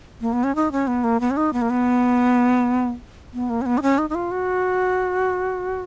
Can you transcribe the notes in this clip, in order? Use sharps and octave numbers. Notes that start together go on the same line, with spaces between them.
A#3
B3
C#4
D#4
C#4
B3
A#3
B3
C#4
D#4
B3
A#3
B3
B3
A#3
C#4
B3
D#4
C#4
D#4
D#4
F4
F#4